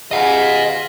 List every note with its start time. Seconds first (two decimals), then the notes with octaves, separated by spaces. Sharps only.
0.11 F4 G#4 D#5 F#5